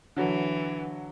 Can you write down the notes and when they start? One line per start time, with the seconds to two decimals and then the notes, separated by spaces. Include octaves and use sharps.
0.16 D3 E3 F#3